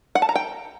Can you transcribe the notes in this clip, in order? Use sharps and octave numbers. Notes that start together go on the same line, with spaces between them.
F#5
A5
A#5
G5